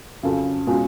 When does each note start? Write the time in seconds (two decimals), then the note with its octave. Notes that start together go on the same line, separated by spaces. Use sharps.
0.23 F2 C#3 F#3
0.67 B2 G#3 C#4 F4